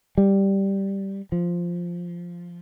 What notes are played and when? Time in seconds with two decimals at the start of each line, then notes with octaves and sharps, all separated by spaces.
0.18 G3
1.32 F3